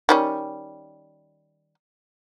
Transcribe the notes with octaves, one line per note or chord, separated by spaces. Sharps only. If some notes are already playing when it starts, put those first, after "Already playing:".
D#3 G3 C#4